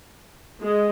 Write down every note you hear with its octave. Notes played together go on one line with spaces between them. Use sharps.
G#3